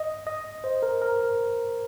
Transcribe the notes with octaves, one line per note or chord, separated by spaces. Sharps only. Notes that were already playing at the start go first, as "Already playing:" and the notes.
Already playing: D#5
D#5
C5
A#4
A#4
A#4